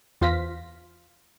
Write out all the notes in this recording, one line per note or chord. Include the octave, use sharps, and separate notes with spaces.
E2 F4 C5 F5 A#6 B6